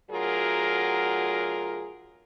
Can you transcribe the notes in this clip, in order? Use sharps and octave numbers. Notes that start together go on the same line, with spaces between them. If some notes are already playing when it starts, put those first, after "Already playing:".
D2 F#3 F4 F#4 G#4 A#4